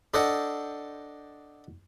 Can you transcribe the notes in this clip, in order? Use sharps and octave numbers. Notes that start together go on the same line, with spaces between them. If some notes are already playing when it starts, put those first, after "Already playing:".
D4 A4 C5 D#5 F#5